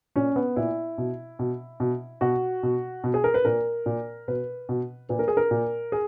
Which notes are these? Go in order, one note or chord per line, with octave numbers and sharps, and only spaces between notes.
A#2 C#4
B3
A#2 E4
B2
B2
B2
B2 F#4
B2
B2
G#4
A#4
B4
A#2 A#4
A#2
B2 B4
B2
A#2 B4
A#4
G#4
A#4
A#2
G#4